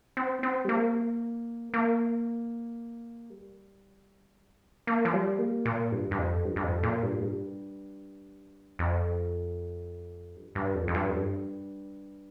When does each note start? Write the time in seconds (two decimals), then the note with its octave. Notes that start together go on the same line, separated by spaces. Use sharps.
0.17 C4
0.43 C4
0.65 G3
0.69 A#3
1.74 A#3
3.30 G3
4.87 A#3
5.05 F3
5.13 G3
5.39 A#3
5.66 A#2
5.92 G2
6.11 G2
6.18 F2
6.44 G2
6.56 G2
6.64 F2
6.83 A#2
7.03 G2
7.17 A#2
7.22 G2
8.79 F2
10.36 G2
10.55 G2
10.75 F2
10.88 F2
10.95 G2
11.10 F2
11.14 G2